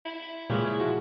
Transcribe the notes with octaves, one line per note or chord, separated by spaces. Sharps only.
E4
A#2 C#3 E3 G#3 C#4 G4
F3 F#4